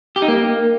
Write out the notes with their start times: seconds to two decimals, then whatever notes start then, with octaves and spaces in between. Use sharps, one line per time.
0.16 G4
0.22 D#4
0.28 A#3